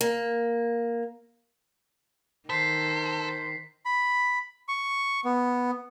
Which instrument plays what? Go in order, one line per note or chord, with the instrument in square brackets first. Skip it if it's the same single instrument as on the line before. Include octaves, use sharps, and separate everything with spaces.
[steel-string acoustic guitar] A#3
[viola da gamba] D#3 [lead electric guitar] A4 [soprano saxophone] C5 [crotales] B6 C7
[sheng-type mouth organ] B5
C#6
B3